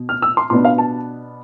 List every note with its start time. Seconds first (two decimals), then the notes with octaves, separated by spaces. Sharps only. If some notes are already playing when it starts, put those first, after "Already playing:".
Already playing: B2
0.09 F6
0.22 E6
0.37 C6
0.50 B2 B3 D4 C6
0.65 F5
0.78 A5